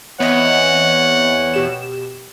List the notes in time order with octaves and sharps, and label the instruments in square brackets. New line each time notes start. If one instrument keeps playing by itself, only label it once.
[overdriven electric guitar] E2 [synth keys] B3 C4 D#5 [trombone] C#5 [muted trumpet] F#5
[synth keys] B2 G4 E7